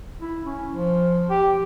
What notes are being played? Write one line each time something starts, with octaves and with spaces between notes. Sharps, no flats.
E4
C#4
F3
G4